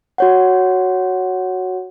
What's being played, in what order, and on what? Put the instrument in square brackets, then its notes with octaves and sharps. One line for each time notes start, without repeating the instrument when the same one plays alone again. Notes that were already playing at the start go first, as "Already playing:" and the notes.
[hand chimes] F#4 C#5 F#5